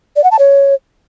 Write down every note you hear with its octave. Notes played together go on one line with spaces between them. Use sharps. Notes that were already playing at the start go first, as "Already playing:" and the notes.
D5
F#5
A5
C#5